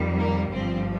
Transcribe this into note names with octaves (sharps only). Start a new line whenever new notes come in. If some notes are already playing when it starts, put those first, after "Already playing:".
Already playing: F2 D#3 G3
A#3
G1 G2 F3 C4